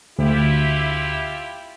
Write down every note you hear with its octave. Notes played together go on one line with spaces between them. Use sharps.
D2 E4 F4 G4